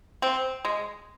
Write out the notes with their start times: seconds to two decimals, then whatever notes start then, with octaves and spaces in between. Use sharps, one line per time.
0.22 C4
0.65 G#3